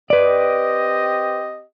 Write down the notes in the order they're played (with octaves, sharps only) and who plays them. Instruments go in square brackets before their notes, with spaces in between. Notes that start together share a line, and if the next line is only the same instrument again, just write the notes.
[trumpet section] C4 G4 D#5 [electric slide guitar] B4 D5